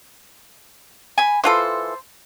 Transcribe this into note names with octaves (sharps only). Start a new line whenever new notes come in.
G#5 B5
E3 F4 A4 C5